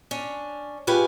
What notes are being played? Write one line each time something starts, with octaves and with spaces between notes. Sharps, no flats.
C#4 D4
G#3 C#4 F4 G4 B4 G#5